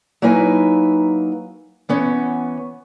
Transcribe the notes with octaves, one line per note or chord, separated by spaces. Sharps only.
F#3 A#3 D#4 E4 B4 G#5
E3 B3 C#4